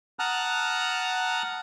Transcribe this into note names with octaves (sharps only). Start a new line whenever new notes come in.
F#5 A5 A#5 D#6 F6 F#6